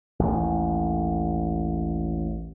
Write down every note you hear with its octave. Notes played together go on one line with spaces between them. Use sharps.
A1 D#2